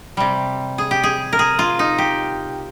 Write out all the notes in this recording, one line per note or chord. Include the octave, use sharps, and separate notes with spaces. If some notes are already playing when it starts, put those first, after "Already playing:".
C3 G3
G#4
G4
G#4
A#4
G#4
F4
D#4
G4